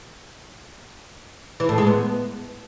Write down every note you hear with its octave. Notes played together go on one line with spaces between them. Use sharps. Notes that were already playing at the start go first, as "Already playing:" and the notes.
E3
A2
G#3
B3